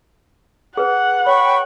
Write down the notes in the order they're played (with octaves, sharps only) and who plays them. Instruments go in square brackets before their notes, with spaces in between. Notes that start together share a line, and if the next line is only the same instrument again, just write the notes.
[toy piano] G#4 B4 [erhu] F#5
[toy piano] C#5 [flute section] G5 B5 C#6